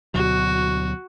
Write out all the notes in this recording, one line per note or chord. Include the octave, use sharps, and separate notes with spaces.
D2 B2 F#3 F#4